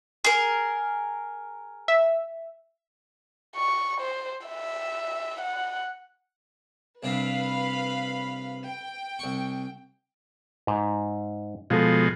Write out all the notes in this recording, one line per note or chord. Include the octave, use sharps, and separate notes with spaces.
G#4 A#4
E5
C#6
C5
E5
F#5
C2 C3 D4 B4 F5 B5
G5
C2 C#6
G#2
B2 F3 G#3 F4 A4